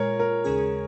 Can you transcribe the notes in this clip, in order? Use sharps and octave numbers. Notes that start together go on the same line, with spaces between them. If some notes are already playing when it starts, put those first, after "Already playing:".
Already playing: A#2 G#3 F4 A#4 C#5
A#4
D#2 C#3 G#3 C#4 G#4